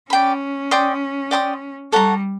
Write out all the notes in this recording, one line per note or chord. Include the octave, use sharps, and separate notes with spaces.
C#4 D5 G5 B5
D5 G5 C6 D#6
D5 G5 C6 D#6
G3 A4 C#5 F#5 A#5